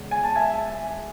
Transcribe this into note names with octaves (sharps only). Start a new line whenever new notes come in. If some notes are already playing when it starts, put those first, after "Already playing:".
Already playing: E2 C#3 G#3
G#5
A5
E5 G#5